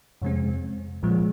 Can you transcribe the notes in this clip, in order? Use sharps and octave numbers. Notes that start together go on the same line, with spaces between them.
F2 C3 G#3 C4
C2 A#2 F3 G#3